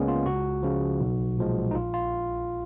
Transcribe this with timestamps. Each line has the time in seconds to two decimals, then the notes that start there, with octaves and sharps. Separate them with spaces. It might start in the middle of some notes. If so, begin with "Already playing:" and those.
Already playing: C#2 C#3 G#3 A#3 B3 C#4
0.08 F4
0.26 C#2 F#4
0.63 C#3 F3
1.01 B1
1.37 A#2 F3 G#3
1.71 D#4
1.75 A#1 F4
1.94 F4